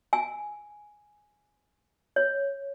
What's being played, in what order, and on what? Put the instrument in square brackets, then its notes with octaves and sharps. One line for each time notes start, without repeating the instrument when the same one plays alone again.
[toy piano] G#5
C#5